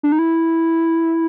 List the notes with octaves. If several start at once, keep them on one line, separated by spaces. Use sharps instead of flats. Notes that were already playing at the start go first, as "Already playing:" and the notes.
D4
D#4
E4